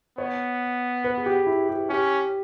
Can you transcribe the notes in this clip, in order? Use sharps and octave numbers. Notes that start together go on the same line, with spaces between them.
B3 C#5
B4
G#4
G4
E4
G4
C#4 G4